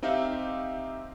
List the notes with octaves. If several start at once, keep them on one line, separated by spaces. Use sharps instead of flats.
C4 D#4 G4 E5 F5